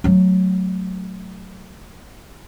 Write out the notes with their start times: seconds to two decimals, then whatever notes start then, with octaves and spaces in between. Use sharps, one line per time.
0.04 F#3 A3